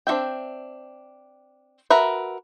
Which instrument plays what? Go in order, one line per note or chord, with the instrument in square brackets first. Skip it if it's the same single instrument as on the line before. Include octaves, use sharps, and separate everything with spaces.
[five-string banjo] C4 D4 F#4 E5 G5
F#4 A#4 B4 E5